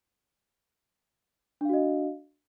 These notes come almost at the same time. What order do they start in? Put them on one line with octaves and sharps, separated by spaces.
D4 F5 F#4 D#5